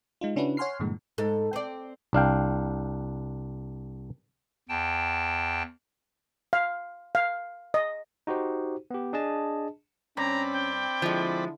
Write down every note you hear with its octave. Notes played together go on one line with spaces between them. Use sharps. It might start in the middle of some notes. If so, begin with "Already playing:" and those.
G#3 D#4 F4
C#3 C#4 D4 E4 F#4 B4
C#5 F#5 G#5 C6 F6 C7
G2 A#2 D3 E3 G#3
G#2 A4
C4 D5
C2 D4 F5 G5
E2 G5 A5
F5
F5
D#5
D#4 F#4 G4 C5
B3 G4
D4 G#4 D#5 A5
G2 C4 C#4 D5 A#5 B5
G5
D3 F3 G#3 E4